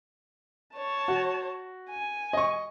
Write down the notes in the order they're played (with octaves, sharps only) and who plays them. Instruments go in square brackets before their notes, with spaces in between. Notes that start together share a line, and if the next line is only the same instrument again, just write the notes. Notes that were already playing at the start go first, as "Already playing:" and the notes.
[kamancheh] C#5 A5
[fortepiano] F#4
[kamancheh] G#5
[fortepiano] D#5 C#6